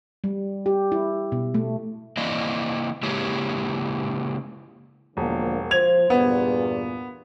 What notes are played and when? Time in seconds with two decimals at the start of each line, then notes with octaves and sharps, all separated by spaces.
0.24 G3
0.66 G4
0.92 E4
1.32 B2
1.54 A3
2.17 E3 A#3 E4 D5 D#5
3.03 C#3 G#3 A#3 E4 G4 C#5
5.17 E1 D3 F3 A#3
5.71 F3 C5 G#6 F7
6.10 E2 G2 A#2 B3